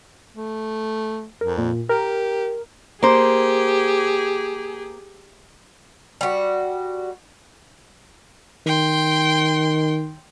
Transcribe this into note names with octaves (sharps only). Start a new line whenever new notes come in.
A3
F2 A#4
A#2
G4 A#4
A#3 G4 G#4 C5
G3 F#4
D#3 G5 C6